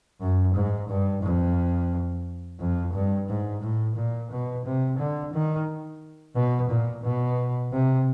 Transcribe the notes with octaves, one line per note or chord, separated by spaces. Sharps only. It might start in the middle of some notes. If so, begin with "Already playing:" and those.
F#2
G#2
G2
F2
F2
G2
G#2
A2
A#2
B2
C3
D3
D#3
B2
A#2
B2
C3